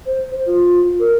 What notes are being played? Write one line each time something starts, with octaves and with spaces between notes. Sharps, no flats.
C5
F4
A#4